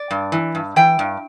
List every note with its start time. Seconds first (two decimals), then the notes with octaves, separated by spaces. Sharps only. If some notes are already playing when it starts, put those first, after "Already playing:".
Already playing: D5
0.11 G2
0.32 E3
0.55 G2
0.76 E3 G5
0.99 G2